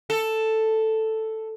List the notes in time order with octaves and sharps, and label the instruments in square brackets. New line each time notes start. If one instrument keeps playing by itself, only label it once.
[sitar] A4